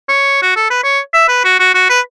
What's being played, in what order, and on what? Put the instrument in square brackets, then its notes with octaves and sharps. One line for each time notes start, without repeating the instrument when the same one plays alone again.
[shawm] C#5
F#4
A4
B4
C#5
E5
B4
F#4
F#4
F#4
B4